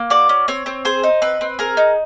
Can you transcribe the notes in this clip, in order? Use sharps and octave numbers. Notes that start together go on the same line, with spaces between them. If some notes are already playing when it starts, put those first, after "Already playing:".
Already playing: A#3
F#4 D5
C#4
C4 C#5
C4
G#4 C5
D#4
C4 B4
C4
G#4 A#4
D#4